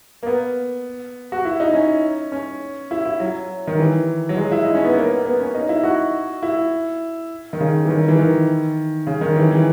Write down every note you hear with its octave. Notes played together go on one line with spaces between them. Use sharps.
A#3
B3
F#4
E4
D#4
C#4
C#4
E4
E4
F#3
D#3
E3
F#3
G#3
E4
D#4
C#4
B3
A#3
B3
B3
C#4
D#4
E4
F#4
E4
D#3
C#3
E3
D#3
E3
D#3
C#3
D#3
E3
E3